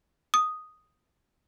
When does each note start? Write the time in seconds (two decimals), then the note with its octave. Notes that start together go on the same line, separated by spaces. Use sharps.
0.34 D#6